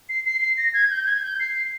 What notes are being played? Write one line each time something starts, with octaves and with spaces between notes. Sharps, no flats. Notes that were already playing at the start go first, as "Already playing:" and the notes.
C7
C7
C7
A#6
G#6
G6
G6
G#6
G#6
G6
C7